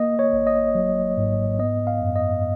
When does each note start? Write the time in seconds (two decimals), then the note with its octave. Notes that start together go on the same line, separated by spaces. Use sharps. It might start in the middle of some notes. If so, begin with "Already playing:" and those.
Already playing: A#3 D#5
0.19 C#5
0.33 G#1
0.47 D#5
0.75 F#3
1.17 G#2
1.59 B3 D#5
1.87 F5
2.01 F#2
2.16 D#5